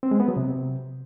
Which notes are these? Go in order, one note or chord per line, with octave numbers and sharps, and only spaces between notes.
C4
G#3
B3
F#3
C3